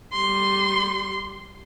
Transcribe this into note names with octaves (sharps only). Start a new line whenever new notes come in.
G3 C6